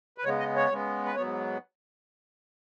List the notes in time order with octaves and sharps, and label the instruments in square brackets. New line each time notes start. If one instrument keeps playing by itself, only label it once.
[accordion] B4
C#3 G#3 B3 C#5
D#5
C#5
C#3 G#3 B3
B4
G#2 F#3 B3 C#5